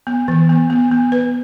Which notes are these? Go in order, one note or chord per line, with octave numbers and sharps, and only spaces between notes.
B3
E3
B3
B3
B3
B4